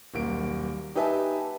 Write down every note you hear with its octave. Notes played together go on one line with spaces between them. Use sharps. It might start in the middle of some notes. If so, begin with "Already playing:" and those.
D#1 B1 A#3 D7
D#4 G4 B4 E5 G#5 A5